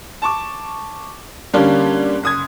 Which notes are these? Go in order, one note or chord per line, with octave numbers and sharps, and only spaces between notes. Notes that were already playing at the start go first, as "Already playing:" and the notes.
A5 C#6 D6
D3 G3 A#3 C#4 D4
F#1 D#6 G#6